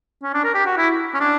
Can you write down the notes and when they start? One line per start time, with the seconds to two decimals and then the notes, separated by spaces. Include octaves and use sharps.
0.23 C#4
0.34 D4
0.44 A#4
0.55 G4
0.66 F#4
0.77 E4
1.14 C#4
1.20 D4